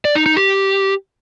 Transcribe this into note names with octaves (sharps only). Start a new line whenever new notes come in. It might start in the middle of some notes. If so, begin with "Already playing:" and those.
D5
D#4
D#4
G4